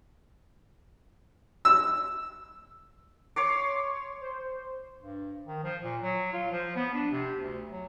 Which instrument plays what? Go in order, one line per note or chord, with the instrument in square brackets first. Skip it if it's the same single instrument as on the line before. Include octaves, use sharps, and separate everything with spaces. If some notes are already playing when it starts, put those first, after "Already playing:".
[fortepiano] E6
[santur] C#5 C6 D6
[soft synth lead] C5
[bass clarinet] G2
D#3
F3
A#2
F#3
F4
F3
B3
D4
C3
D2
F#3